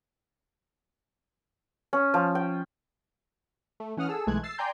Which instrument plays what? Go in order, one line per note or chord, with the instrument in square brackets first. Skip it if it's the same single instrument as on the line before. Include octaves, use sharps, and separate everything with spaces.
[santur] C#4
F3
G5
[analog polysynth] A3
E3 C#4 F#5 D#6 F6
G#4 A4 E6
B1 E3 G#3 A3 F#6 G#6
E6 A6 C7
D5 G5 G#5 A#5 C6 G6